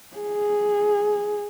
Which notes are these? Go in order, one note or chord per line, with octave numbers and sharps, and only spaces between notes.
G#4